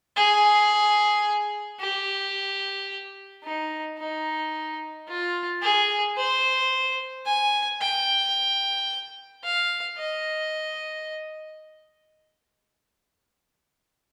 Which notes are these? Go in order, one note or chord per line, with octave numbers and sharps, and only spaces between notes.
G#4
G4
D#4
D#4
F4
G#4
C5
G#5
G5
F5
D#5